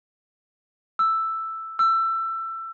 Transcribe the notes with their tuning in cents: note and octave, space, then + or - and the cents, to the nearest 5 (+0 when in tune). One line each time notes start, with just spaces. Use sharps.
E6 +5
E6 +20